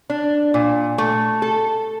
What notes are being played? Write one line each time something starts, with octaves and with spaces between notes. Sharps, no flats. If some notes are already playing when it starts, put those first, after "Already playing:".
D4
A#2
A3
A4